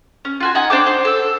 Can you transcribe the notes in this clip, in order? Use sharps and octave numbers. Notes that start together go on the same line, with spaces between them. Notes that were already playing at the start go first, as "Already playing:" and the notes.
C#4
F4 F#4 G#5
D#4 F#5 G#5
D4 C5 G5 D6
C5
A4 E6